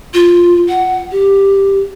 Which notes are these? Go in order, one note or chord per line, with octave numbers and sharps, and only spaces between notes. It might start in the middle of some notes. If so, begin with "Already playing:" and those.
F4
F#5
G4